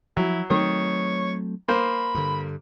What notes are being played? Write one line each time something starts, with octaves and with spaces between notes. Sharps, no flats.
F3 F#3 E4
D#3 F#3 A3 C4 C#5
A#3 C5 B5
G2 D3